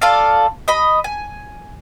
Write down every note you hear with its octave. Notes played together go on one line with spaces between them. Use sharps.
F4 A4 D5 F5
D#5 B5
G#5